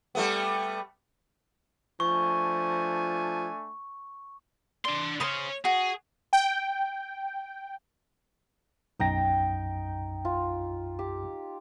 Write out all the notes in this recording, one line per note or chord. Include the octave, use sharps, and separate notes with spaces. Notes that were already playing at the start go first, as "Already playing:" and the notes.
G3 A3 B3
F3 A3 D4 G#5 C#6
D4 D5 C6
C#3 C#4 C5 C6 D#6
F#4 G#4
G5
B1 F#2 D#4 G5 A#6
F4
G4